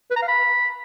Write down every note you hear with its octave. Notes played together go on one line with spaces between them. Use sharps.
B4
A#5
F5
B5